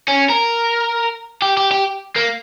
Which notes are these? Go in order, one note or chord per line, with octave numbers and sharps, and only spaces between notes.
C#4
A#4
G4
G4
G4
A#3